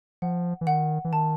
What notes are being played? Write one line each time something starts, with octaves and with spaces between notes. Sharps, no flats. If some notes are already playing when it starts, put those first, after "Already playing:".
F3 F#5
E3
D#3 F#5
E3
D#3 A5